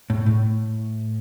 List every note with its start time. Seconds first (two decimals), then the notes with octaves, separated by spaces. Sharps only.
0.10 A2
0.26 A2